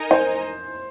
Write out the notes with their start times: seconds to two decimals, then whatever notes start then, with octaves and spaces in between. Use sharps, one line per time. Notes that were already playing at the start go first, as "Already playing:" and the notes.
Already playing: D#4 A#4 D#5 G#5
0.11 C5